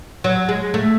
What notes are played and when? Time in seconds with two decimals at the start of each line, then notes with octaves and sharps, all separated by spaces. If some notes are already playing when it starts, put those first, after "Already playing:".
0.24 F#3
0.49 G#3
0.74 A3